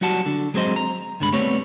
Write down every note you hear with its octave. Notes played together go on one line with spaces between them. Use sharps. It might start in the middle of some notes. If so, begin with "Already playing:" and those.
F#3 G3 F#4 F#5 A5
D3
F#3 G#3 C4 C5 D#5
A#5
C#2 G2 D3 G#3 B5
G3 A3 B3 C4 C#5